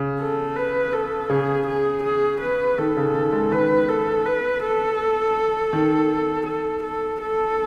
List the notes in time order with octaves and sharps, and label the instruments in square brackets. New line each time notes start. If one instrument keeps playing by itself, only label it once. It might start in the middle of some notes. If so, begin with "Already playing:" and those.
Already playing: [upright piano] C#3
[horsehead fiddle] A4
B4
A4
[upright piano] C#3 [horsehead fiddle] G#4
[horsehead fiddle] G#4
G#4
B4
[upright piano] D#3 [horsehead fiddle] A4
[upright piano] C#3
D#3
G#3
[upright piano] D#3 [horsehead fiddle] B4
[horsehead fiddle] A4
B4
A4
[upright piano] D#3
[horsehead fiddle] A4
A4
A4